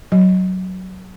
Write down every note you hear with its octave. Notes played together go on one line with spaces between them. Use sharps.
F#3